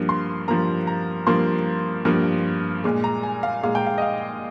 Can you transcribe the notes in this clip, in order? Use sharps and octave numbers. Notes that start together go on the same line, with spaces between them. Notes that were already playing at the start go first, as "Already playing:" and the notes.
Already playing: G2 F3 A#3
C6
G2 F3 A#3 A#5
A#5
G2 F3 A#3 C6
G2 F3 A#3
A#2 G#3
A#5
G#5
F5
A#2 G#3 F5
G5
F5
D#5
F5